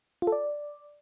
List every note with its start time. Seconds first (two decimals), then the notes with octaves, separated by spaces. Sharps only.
0.22 F4
0.27 A4
0.32 D5